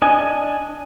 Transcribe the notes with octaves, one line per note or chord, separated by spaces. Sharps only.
D4 D#5 G#5